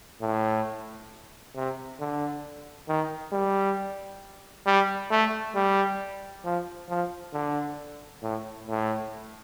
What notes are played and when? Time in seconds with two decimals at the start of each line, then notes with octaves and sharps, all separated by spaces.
0.21 A2
1.55 C3
2.00 D3
2.89 D#3
3.32 G3
4.67 G3
5.11 A3
5.55 G3
6.45 F3
6.89 F3
7.33 D3
8.23 A2
8.68 A2